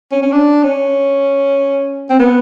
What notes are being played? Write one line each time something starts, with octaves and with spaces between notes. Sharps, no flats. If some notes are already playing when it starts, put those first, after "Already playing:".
C#4
C#4
D4
C#4
C4
B3